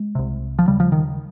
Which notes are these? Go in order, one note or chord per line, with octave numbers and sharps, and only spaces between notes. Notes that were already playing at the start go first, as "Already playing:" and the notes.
Already playing: G#3
C2 C3
F3
D#2 C#3 G3
F3
D#3